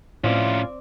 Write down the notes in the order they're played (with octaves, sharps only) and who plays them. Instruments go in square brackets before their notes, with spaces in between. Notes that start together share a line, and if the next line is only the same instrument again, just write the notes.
[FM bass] A2 [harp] C4 D5 [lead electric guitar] C#4 E4 [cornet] F4